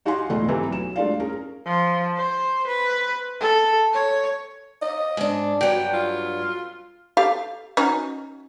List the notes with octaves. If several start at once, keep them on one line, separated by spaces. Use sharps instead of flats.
D#4 F#4 G4 F5 G#5 C6
E1 A2 A3 F4 D#5
E3 F#3 A3 C4 G4
B1 E7
G#3 A3 D4 F4 D5 F5
C#4 G#4 A#4
F3
C5
B4
A4
C#5
D#5
G#2 D4
G2 F#3 G5
F4
G4 A4 F5
C#4 D#4 F#4